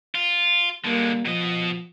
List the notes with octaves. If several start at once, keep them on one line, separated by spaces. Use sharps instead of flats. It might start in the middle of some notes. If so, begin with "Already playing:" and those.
F4
D3 G3 G#3 A#3
B2 F3 D#5